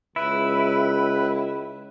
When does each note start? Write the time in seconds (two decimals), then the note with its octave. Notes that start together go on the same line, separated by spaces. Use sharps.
0.16 C#2 E4 B4